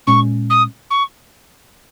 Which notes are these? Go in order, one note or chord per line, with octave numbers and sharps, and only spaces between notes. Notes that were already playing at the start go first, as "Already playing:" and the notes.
A#2 G#3 C#4 C#6
D#6
C#6